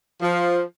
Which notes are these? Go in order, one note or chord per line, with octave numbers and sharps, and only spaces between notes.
F3